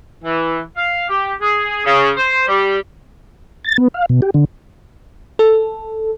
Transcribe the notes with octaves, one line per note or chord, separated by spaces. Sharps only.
E3
F5
G4
G#4
C#3
C5
G3
A6
B3
F5
B2
G4
D3
A4